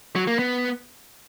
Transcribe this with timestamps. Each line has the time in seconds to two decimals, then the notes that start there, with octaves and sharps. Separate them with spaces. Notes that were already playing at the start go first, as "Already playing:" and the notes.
0.16 F#3
0.27 A#3
0.39 B3